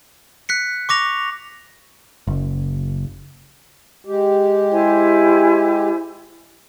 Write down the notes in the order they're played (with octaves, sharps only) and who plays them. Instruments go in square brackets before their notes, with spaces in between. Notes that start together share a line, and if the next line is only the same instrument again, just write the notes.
[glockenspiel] F#6 B6 C#7
C#6 D6 A#6 F7
[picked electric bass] F#1
[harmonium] G#3 G4
[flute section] E4 C5 G#5